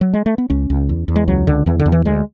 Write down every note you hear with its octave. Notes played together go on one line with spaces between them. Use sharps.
F#3
G#3
A3
B3
C#2 C#4
C#2
E2
E2
G#3
C#2 F#3
C#2 D3
E2 E3
D3
E2
E3
D2 G#3